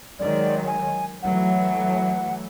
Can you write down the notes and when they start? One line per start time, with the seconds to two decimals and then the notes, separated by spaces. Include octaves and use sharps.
0.19 D#3 F#3 G#3 D5
0.67 G#5
1.23 E3 F#3 A3 F#5